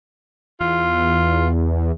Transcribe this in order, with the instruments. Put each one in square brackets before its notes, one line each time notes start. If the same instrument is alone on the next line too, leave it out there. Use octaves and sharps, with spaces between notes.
[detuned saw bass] E2 [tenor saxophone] F4